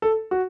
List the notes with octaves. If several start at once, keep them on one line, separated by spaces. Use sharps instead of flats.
A4
F#4